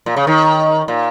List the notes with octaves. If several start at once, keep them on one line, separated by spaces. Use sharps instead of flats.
A#2
C#3
D#3
A#2